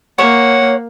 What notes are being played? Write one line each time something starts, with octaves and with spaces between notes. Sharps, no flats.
A#3 C#5 F#5